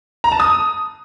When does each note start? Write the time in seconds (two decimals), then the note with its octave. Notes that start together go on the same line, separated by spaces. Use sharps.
0.24 A#5
0.32 A5
0.40 D#6